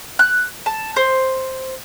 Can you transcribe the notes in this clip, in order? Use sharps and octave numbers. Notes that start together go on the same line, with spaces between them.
F#6
A5
C5